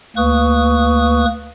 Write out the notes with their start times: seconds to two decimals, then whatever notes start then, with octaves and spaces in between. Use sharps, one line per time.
0.16 D2 A#3 B4 C#6 D#6